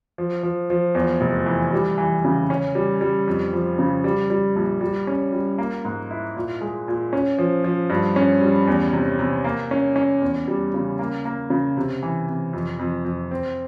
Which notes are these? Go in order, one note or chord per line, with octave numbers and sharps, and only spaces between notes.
F3
F3
F3
E2
F1
E3
G3
E3
C#3
C#4
G3
G3
F2
F3
C#3
G3
G3
A#1
G3
C#4
G3
A#3
G#2
E4
A#2
G#3
A#2
C#4
F3
F3
G2
C#4
G3
E2
C3
C3
A#3
C#4
C#4
E2
G3
C#3
A#3
A#3
C#3
C3
E3
C3
F2
F2
F2
C4